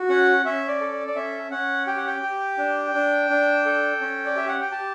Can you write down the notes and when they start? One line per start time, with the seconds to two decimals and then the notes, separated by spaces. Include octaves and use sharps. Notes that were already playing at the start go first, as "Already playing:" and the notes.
Already playing: F#4
0.09 C#4 F#5
0.45 C#4 E5
0.68 D5
0.81 A4
0.92 D5
1.07 D5
1.16 C#4 E5
1.51 C#4 F#5
1.87 G4 G5
1.97 F#5
2.07 G5
2.22 G4
2.58 D4
2.94 D4
3.30 D4
3.66 A4
4.01 C#4
4.25 D5
4.36 G4 E5
4.49 F#5
4.61 G5
4.72 G4 A5